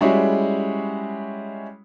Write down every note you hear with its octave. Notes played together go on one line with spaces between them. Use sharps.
G3 G#3 C#4 E4 F#4 G#4